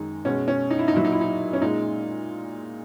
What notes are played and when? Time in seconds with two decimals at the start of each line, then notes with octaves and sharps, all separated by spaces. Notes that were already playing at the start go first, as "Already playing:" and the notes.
Already playing: F#2 D#3 G#3 D#4
0.25 B2 G#3 C#4
0.48 C#4
0.71 D#4
0.79 E4
0.88 D#4
0.93 A#2 F#3 E4
1.05 D#4
1.13 E4
1.21 D#4
1.53 C#4
1.61 A#2 G#3 D#4